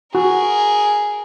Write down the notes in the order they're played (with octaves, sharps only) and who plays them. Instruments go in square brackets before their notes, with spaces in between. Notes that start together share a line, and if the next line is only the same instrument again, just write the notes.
[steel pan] F#4 [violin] G#4 A#4